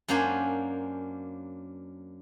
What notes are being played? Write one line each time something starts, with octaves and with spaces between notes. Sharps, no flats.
F#2 A#3 C#4 D4 C5 G#5